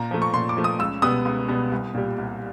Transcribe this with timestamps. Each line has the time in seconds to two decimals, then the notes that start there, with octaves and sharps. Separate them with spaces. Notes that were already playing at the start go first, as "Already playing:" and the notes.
Already playing: A#2 A#5
0.11 F3 A3
0.22 C#6
0.34 A#2 C6
0.49 D6
0.57 F3 A3
0.64 D#6
0.79 C#2 E6
1.02 B2 G3 B3 D#6
1.25 C#2
1.48 B2 G3 B3
1.72 C2
1.94 A#2 G3
2.18 C2